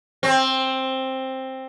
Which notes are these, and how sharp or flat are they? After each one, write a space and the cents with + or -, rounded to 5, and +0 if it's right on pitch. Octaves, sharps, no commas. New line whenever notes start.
C4 +10